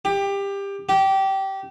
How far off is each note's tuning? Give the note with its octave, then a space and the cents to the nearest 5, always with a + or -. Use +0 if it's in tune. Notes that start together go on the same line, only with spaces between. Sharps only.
G4 +20
G4 -20